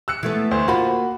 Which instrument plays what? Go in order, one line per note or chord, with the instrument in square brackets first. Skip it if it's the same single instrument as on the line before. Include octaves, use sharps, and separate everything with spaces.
[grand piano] E6 F#6 C#7
[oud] E3 A3 B3
[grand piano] D2 C5
[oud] A#3 F4 C5 [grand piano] F#4 B5